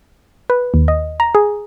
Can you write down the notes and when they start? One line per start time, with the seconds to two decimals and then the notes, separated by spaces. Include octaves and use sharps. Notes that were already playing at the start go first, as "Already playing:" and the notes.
0.50 B4
0.74 D#2
0.88 D#5
1.20 A#5
1.35 G#4